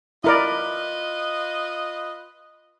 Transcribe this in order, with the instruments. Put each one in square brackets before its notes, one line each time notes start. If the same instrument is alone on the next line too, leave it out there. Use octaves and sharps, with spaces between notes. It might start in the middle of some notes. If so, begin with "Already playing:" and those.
[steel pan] E4 A#4 D5 [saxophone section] F4 B4 D#5